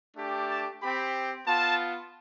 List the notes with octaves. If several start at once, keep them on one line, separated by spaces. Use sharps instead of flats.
A3 D4 G4
A5
C4 G4 B5
B3 F4 A5